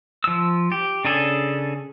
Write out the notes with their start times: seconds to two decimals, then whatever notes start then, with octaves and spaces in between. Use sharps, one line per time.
0.24 F3 E6
0.72 G4
1.05 C#3 D4 G#4 A4